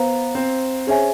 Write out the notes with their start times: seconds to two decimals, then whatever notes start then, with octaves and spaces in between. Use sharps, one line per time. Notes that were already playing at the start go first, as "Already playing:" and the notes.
Already playing: B3 C5 F5 A#5
0.35 C4
0.87 C#4 G#4 C5 E5 G#5